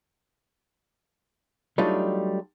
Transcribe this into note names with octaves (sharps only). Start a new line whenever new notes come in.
F#3 G3 A3 D4 D#4 F4